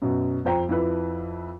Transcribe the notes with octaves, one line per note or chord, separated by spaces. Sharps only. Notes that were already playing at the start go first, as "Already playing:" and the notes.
F#2 B2
F2 C5 G5 A#5
F2 E4 B4